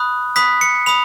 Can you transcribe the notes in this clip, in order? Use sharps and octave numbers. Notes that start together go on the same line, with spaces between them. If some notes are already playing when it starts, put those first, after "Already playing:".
Already playing: B5 D#6 F#6
B5 D#6 F#6 B6
C#7
B5 D#6 F7